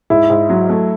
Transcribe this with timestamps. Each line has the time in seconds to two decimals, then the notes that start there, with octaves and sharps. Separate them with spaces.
0.10 G#2 E4
0.30 G#2
0.50 F#3
0.70 A3